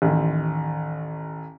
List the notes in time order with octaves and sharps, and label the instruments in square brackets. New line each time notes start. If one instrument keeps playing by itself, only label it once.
[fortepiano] A1 D#2